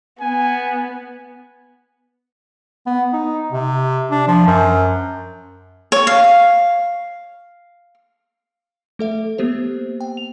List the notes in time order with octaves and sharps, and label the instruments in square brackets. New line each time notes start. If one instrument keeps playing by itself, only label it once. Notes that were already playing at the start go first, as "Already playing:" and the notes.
[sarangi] B3 [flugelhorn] G#5
[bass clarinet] B3
D#4
C3
D4
F3
F#2
[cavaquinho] C#5
F5
[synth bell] A3 A4 E5
A#3 B3 G4 C5
G5
F7